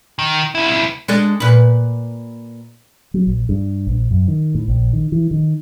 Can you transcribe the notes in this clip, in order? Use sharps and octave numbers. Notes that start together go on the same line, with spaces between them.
D#3
C#2 E4
G#3 D4 A4
A#2 B4
F#3
A#1
G2
A#1
F#2
D#3
A2
A#1
D#3
E3
D#3